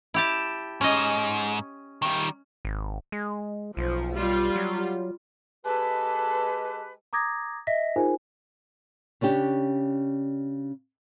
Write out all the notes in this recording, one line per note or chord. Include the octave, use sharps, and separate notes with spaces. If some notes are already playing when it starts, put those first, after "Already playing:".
E4 G4 A5
G#2 C#4 D#5
D#3 G3
G#1
G#3
B1 F3
G3 F4
F#3
G#3 G4 A4 B4
A#5 D6 D#6 G#6 A#6
D#5 E5 A#6 B6
D#4 F4 G#4 A#4 C5 G#5
C#3 C#4 D4 G4